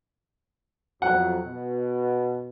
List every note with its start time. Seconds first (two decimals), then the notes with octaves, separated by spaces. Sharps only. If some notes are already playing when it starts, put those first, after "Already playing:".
1.02 F2 F#3 F#5
1.45 B2